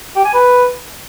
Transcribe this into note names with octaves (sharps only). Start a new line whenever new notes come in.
G4
G#5
B4